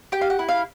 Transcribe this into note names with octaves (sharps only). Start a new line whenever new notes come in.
G4 G5
F5
F#5
E4
F5